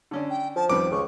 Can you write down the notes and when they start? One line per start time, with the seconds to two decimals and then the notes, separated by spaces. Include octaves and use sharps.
0.11 D3 C#4 D4
0.30 G5
0.56 F3 A5
0.70 F2 D#3 G3 B4 D6
0.91 C#2 C#6